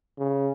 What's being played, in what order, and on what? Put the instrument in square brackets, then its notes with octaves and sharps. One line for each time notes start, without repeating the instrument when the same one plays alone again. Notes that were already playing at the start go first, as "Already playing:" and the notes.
[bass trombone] C#3